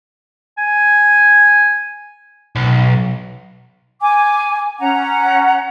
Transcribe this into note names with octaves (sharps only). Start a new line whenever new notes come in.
G#5
B1
G#5 D6
C#4 F#5 A#5